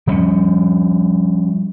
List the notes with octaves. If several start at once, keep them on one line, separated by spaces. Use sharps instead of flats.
F3 G3 C#4